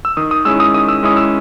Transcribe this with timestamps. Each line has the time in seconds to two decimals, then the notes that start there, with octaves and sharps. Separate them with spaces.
0.05 E6
0.17 D#3 D#6
0.31 D#6
0.45 G#3 C#4 E4 E6
0.60 D#6
0.74 D#3 D#6
0.88 E6
1.03 G#3 C#4 E4 D#6
1.17 E6